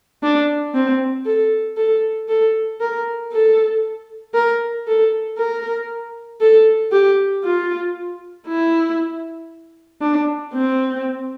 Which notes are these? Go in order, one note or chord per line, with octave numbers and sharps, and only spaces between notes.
D4
C4
A4
A4
A4
A#4
A4
A#4
A4
A#4
A4
G4
F4
E4
D4
C4